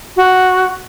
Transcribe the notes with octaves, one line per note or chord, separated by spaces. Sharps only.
F#4